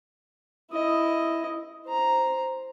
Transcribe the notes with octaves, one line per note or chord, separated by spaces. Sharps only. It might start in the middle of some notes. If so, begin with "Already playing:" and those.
E4 D#5
C5 A#5